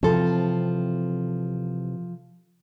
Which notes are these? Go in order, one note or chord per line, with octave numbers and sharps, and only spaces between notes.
C3 E3 F3 C4 A4